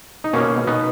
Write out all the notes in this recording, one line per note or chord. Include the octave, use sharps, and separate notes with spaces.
D#4
B2 A#3 C#4
B2 B3 D#4